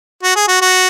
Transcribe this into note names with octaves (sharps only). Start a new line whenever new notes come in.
F#4
G#4
F#4
F#4